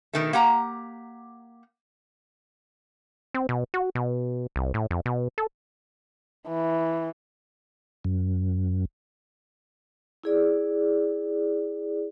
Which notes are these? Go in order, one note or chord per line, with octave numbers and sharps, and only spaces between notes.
B2 D#3 A3
A#3 G4 F#5 A#5
C4
B2
F#4
B2
C2
A2
F2
B2
A4
E3
F#2
E4 G#4 D5